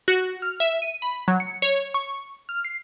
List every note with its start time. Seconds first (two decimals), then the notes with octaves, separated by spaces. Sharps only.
0.08 F#4
0.42 F6
0.60 E5
0.82 D#7
1.02 B5
1.28 F#3
1.40 C#7
1.62 C#5
1.94 C#6
2.49 F6
2.65 C7